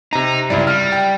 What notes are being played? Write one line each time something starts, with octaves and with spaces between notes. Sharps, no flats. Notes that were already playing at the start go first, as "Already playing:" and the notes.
C3 D#4 A#5
C#2 G2 E4 D5
G3 F6
G5